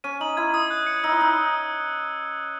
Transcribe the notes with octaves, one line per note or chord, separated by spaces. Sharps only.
C#4 D#7
D#4 F#7
E4 G#6
D#6
F#6
C#7
D#4 E6
E4
D#4 E6